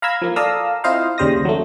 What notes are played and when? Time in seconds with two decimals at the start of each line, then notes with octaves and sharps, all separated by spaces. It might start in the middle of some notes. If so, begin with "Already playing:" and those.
0.02 F5 A#5 B5 E6 G#6 B6
0.22 F3 A#3
0.36 A4 D5 F5 A#5 D#6 E6
0.84 C4 E4 F4 C5 D#5 F5
1.18 D#2 C#3 G3 C5 D#6 A#6
1.45 F#3 A3